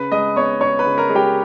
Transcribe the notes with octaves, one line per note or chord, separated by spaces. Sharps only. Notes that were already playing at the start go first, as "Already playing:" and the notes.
Already playing: C#3 B4 B5
G#3 D#5 D#6
B3 C#5 C#6
C#3 C#5 C#6
B4 B5
C#3
A#4 A#5
G#3
G4 G5